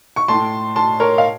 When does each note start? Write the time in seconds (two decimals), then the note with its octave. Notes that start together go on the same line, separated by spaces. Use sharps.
0.16 C#6
0.28 A2 A3 A5 C6
0.76 A5 C6
1.00 A#4 C#5
1.18 F5